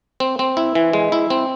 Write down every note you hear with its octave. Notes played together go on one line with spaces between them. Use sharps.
C4
C4
E4
E3
G#3
E4
C4